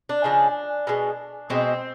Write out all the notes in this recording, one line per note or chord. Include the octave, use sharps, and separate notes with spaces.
D4
C#3 F3 G#3
B2 G#3
B2 G#3 C4